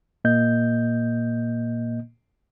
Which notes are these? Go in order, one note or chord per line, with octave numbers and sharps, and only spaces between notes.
A#2 A#3 D#5 G6